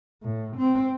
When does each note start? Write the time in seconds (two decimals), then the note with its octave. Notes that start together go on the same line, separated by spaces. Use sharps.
0.23 A2
0.57 C4